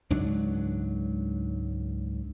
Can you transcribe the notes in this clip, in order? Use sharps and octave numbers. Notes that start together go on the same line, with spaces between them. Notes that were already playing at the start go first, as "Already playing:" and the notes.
C#2 G#2 F#3 D4